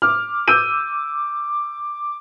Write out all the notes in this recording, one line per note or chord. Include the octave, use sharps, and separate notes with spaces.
D6 F6
E6 G6 D#7